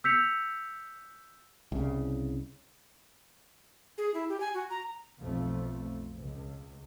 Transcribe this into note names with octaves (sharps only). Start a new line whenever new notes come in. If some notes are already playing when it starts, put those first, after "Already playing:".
E6 G6 B6 C#7 F7
C2 C#3
G#4
E4
G4
G#5
F#4
A#5
B1 F2 F3 A3
C#2